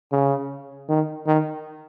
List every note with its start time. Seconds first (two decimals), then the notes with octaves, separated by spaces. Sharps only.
0.12 C#3
0.89 D#3
1.27 D#3